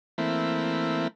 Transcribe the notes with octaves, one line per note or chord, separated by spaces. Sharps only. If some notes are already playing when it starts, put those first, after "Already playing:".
E3 A3 A#3 C4 E4